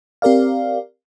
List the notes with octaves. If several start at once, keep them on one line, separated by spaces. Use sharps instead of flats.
C4 G4 A#4 D5 F5